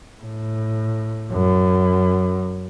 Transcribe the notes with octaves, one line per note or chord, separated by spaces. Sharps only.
A2
F#2